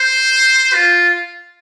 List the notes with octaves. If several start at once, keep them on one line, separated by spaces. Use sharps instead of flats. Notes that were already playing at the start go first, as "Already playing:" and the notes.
Already playing: C5
F4